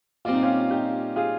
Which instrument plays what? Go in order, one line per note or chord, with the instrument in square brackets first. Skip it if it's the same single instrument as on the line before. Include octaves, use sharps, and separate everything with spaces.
[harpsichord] A#2 G3 C4 [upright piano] F4
[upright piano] D#4
C#4 F4
D#4 G4
F4 G#4